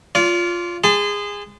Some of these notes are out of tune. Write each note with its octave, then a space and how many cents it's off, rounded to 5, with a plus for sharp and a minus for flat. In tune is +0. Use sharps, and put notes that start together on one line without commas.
F4 +0 D5 -40
G#4 -20 A5 +5 C6 -30